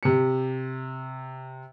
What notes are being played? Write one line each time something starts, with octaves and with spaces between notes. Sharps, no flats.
C3 C#7